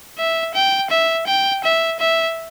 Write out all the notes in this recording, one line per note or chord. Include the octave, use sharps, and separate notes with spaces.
E5
G5
E5
G5
E5
E5